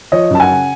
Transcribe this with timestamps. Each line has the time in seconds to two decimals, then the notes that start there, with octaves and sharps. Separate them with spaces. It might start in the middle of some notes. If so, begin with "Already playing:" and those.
0.12 F3 C#5 D#5
0.30 F#2 A5
0.40 F#5 G#5
0.50 C#3